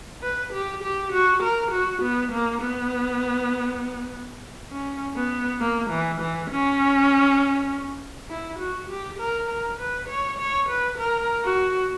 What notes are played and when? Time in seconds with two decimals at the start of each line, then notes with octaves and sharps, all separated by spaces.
0.23 B4
0.53 G4
0.83 G4
1.13 F#4
1.43 A#4
1.72 F#4
2.02 B3
2.32 A#3
2.62 B3
4.71 C#4
5.16 B3
5.61 A#3
5.90 E3
6.21 E3
6.50 C#4
8.30 E4
8.59 F#4
8.89 G4
9.20 A#4
9.49 A#4
9.79 B4
10.09 C#5
10.39 C#5
10.69 B4
10.99 A#4
11.44 F#4